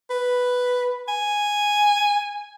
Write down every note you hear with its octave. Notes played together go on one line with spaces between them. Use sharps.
B4
G#5